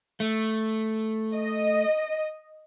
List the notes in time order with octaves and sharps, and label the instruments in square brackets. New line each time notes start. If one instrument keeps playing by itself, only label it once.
[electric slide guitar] A3
[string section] D#5